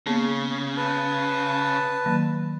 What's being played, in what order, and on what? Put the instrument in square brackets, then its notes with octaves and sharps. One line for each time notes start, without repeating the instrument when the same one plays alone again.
[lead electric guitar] C#3 [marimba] A#3 B3 G#4
[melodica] B4 A5
[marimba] D#3 F#3 A#3